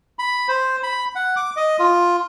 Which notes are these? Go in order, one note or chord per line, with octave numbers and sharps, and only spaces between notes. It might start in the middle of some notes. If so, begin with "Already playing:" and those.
B5
C5
B5
F#5
D6
D#5
F4